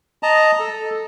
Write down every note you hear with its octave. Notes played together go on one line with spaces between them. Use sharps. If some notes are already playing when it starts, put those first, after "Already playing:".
D#5 A5 A#5
A4